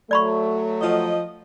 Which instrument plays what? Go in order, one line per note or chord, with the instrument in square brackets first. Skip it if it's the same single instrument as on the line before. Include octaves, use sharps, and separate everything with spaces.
[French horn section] F#3 A3 [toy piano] D5 B5 C#6
[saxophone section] F3 D#5